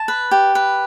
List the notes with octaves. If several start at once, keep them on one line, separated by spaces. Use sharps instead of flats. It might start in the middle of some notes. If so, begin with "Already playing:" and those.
Already playing: A5
B4
G4
B4